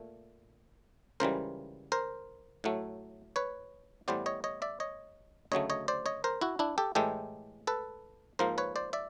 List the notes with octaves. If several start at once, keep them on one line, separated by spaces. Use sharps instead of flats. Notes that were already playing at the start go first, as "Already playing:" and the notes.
Already playing: A#2 A3
C#2 C#3 E3 G3 A#4 C5
A#4 C5
A2 F#3 A3
B4 C#5
A2 E3 G3 B3 C5 D5
C#5 D#5
C#5 D#5
D5 E5
C#5 D#5
D2 C#3 F#3 A3 C#5 D#5
C#5 D#5
C5 D5
C#5 D#5
A#4 C5
E4 F#4
D4 E4
G4 A4
A2 E3 G#3 G4 A4
A4 B4
G#2 F3 A#3 A#4 C5
B4 C#5
C5 D5
D5 E5